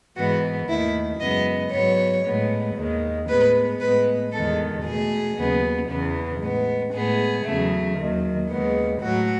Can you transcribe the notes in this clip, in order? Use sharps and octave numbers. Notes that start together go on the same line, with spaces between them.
G#2 E3 G#3 B3 F#4
D#2 D#3 A3 E4
F#2 C#3 G#3 B3 D#5
G#2 F#3 B3 C#5
A2 G#3 B3
D#2 D#3 G#3
A2 G#3 B3 B4
A2 G#3 B3 B4
E2 D#3 G#3 B3 A4
B2 A3 G#4
D#2 C#3 F#3 B3
E2 C#3 E3 B3
A2 G#3 B3
A2 G#3 B3 G#4
E2 C#3 F#3 A3
D#2 D#3 F#3
D#2 C#3 G#3 B3
A2 F#3 A3 F#4